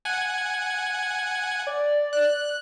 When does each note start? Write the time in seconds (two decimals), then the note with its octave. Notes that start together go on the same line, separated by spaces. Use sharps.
0.05 F#5 G#5
1.67 D5
2.13 F#6